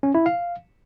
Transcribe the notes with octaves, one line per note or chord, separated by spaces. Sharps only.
C#4
E4
F5